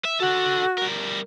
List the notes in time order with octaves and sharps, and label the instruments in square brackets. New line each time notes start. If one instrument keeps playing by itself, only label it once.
[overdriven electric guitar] E5
[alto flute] F#4 [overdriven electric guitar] A4 F#5
[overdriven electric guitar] G3 A#4